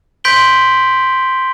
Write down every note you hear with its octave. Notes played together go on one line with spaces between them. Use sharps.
C6 G6 B6 D7 F#7 G7